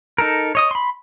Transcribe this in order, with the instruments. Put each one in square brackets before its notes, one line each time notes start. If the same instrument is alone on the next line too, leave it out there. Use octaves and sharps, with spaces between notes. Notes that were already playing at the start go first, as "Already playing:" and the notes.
[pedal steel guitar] D#4 A4 A#4
C#5 D#5 D#6
B5 C6